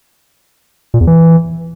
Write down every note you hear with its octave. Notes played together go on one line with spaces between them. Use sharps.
A#2
E2
E3